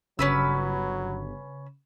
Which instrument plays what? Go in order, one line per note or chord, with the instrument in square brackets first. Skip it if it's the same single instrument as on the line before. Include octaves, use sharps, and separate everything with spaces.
[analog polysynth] G1 [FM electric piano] C#3 [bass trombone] F#3 [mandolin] C#4 B4 E6